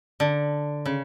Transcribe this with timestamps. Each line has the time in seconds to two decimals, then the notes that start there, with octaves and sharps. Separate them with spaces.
0.20 D3
0.86 C#3